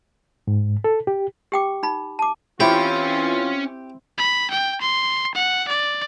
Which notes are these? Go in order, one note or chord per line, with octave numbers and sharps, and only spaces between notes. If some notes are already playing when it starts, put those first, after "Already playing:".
G#2
A4
G4
G4 G5 D6
D#4 B5
A5 D6
E3 C4 C#4 E4 F4 G4 C#5
B5
G5
C6
F#5
D5